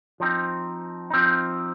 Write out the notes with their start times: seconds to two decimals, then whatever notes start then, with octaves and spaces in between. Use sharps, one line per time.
0.20 F3 C4 D#4
1.10 F3 C4 D#4